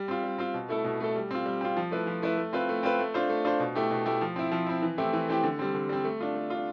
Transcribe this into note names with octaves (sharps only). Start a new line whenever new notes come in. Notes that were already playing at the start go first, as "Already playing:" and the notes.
Already playing: G3
C4 F4
G3
C4 F4
B2
A3 E4 A4
B2
A3 E4 A4
G3
C4 F4
G3
C4 F4
F3
A3 E4 B4
F3
A3 E4 B4
A3
C4 F4 B4
A3
C4 F4 B4
A3
D4 F4 C5
A3
D4 F4 C5
B2
A3 E4 G4
B2
A3 E4 G4
F3
C4 E4
F3
C4 E4
E3
A3 C4 E4 G4
E3
A3 C4 E4 G4
D3
G3 C4
D3
G3 C4
A3
D4 F4
A3
D4 F4